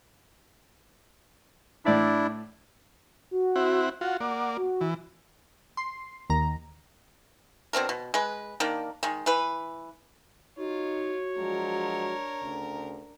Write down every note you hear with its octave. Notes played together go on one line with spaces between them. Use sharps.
A2 D4 E4 D5 E5
F#4
C4 E4 F#5
F4 F#4 F#5
A#3 D5
F#4
E3
C6
D#2 A#5
B2 C4 D4 A#4
B2
G#3 B4
D#3 A#3 D4
D#3 G#3
E3 B4
D#4 F4 F#4 C#5
F3 F#3 G#3 D4 A#4
D2 C#3